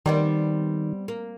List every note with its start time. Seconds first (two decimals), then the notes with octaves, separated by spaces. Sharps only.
0.06 D#3 G3 B3 C4
1.08 A#3